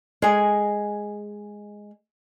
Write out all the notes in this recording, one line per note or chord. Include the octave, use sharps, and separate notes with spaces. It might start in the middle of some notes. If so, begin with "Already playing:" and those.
G#3 G#4